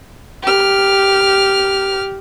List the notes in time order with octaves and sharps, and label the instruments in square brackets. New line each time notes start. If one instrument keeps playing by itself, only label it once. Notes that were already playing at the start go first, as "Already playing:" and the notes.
[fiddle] G4 F6